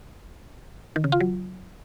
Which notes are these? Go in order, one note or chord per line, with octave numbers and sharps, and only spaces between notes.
D#3
C#3
F4
F#3